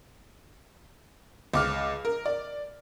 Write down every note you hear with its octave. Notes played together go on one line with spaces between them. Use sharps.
C#2 D6 F6
A#4
D5